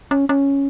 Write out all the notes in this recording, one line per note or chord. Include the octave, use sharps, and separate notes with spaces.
C#4
C#4